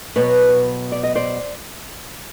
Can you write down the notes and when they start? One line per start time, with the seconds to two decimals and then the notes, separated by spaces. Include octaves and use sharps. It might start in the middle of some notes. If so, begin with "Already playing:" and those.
0.16 B2 F#3 B3 B4 C#5
0.92 D5
1.03 D#5
1.15 C5 D5